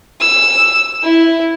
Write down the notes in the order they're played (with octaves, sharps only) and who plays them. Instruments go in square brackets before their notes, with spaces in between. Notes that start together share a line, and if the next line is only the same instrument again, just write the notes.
[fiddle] E6
E4